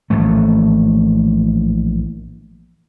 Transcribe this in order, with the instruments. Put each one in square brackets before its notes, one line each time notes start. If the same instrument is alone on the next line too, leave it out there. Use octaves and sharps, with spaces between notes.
[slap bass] A#1 A2 E3 A3